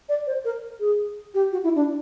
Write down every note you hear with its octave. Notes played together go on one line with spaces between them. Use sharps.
D5
C5
A#4
G#4
G4
F#4
E4
D4